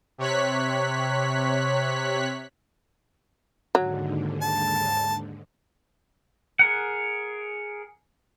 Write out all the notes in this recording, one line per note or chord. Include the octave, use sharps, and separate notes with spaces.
C3 C#5 F#6 B6
D#2 G#2 D3 F#3
A5
G#4 A#4 F#5